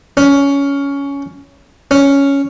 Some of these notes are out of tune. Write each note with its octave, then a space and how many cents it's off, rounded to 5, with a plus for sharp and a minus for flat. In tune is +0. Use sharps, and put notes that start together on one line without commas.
C#4 +15
C#4 +5